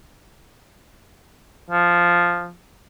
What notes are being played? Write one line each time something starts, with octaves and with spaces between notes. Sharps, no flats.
F3